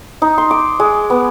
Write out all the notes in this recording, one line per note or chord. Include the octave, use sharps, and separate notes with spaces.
D#4
C6
D6
G#3
B3